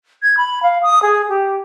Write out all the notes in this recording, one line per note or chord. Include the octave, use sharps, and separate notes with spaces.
G#6
B5
F5
D#6
G#4
G4